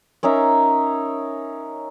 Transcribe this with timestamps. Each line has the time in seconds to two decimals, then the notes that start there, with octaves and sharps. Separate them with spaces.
0.23 C#4 D#4 A#4 E5